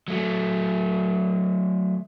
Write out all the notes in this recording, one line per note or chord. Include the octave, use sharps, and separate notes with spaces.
F#3 A3